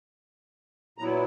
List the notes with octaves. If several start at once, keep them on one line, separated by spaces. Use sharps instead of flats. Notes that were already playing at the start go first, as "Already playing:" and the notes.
A#2 F#3 B3 E4 A#5